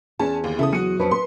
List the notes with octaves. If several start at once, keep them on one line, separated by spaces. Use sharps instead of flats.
E2 C#4 G#4 A5
D#2
C#3 E4 A4 D#6
F#3 F#4 C#7 D#7
F2 C#4 B4
B4 C6